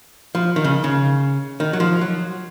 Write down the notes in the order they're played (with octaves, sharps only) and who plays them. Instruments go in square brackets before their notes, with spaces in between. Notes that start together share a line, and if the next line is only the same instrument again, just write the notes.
[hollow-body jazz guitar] F3
D#3
C#3
C#3
D#3
F#3
F3
F#3